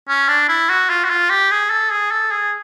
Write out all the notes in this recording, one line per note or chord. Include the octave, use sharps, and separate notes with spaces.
C#4
D4
E4
F#4
F4
F#4
F4
G4
G#4
A4
G#4
A4
G#4